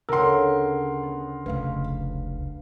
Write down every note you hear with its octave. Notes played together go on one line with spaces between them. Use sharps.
D2 C#3 B3 A#4 F#5 C6 E6
B3
F1 C#2 B4 F5